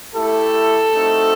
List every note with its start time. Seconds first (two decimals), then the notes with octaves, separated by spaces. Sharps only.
0.14 A3 E4 G4 A4
0.93 A3 C4 D#4 F#4